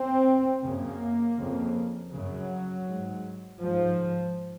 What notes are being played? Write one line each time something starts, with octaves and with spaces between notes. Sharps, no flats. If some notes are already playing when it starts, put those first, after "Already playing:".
Already playing: C4
F#2 C#3 A#3
F2 C#3
F#2 C#3 F#3
G#2
G#2 F3